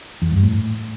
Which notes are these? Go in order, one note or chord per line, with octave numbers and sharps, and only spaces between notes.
E2
G2
A2